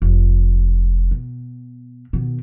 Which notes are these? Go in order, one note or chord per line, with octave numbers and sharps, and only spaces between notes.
F1
B2
B2 D#3